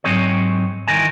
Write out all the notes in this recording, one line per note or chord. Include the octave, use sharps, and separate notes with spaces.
G#2 F#3 C4 G#4 C#5
C2 D#3 E3 A#4 G#5